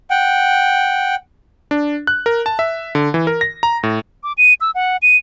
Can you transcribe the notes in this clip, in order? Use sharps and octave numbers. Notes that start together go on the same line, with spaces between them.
F#5 G5
D4
F#6
A#4
A5
E5
D3
E3
A#4
A#6
A#5
A2
D6
D#7
E6
F#5
D#7